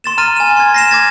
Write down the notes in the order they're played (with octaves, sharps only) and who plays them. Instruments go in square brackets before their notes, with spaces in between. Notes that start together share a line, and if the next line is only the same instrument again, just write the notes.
[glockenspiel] C6 A6 E7
A#5 F6 A6 D#7
G#5 E7
C6 G#6
A#6 C7 E7
D6 G#6 A6